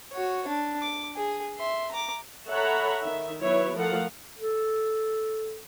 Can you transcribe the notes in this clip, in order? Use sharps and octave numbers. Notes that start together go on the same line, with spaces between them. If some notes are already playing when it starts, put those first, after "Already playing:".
F#4 C#5
D4
D6
G#4
E5 C6
A#5 D6
A4 C#5 E5 F#5 A#5 B5
D#3 E5
F#3 B3 E4 B4 C#5 E5
F3 A3 A4 A#4 F5 F#5
A4